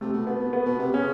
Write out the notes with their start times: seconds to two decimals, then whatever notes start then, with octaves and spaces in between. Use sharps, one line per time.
0.01 C3 A3
0.13 B2
0.27 B2 B3
0.39 B2
0.53 B3
0.66 B2
0.79 C3
0.92 C#3 C#4